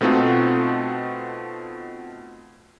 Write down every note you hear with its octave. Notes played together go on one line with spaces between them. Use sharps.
B2 A3 C4 D#4 F4 F#4